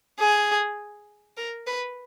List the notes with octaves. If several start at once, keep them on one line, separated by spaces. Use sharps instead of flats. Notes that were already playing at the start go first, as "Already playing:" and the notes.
G#4
A#4
B4